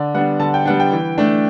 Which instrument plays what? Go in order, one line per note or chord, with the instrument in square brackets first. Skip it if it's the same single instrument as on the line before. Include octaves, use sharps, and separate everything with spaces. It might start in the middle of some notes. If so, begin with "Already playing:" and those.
Already playing: [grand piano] D3 D5
G3 B3 D4 F#5
D3 A5
G5
G3 B3 D4 F#5
G5
E3
A3 D4